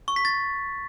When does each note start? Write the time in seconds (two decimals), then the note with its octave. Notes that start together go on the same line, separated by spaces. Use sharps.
0.08 C#6
0.16 B6
0.25 A6